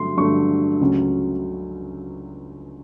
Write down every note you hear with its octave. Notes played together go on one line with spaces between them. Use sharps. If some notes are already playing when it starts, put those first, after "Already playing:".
Already playing: G2 D3 F#3 A3 C6
G2 D3 F#3 A3 C#6
C#2 C#3 F#3 A3 C#4